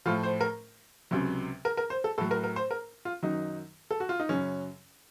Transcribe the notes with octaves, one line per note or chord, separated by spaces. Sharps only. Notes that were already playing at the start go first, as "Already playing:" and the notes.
A2 F3 F4
C5
A#4
C#2 C3 F#3
A#4
A#4
C5
A4
A2 F#3 A4
A#4
A#4
C5
A#4
F4
F#2 D#3 F#3 D#4
A4
F#4
F4
D#4
F#2 C#3 F#3 C#4